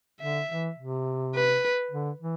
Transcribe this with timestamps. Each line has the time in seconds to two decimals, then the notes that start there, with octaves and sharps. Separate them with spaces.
0.21 D3 E5
0.50 E3
0.78 C3
1.35 B4
1.91 D3
2.20 E3